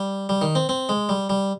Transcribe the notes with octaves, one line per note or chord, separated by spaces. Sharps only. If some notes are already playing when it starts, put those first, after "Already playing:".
Already playing: G3
G3
D#3
C4
C4
G#3
G3
G3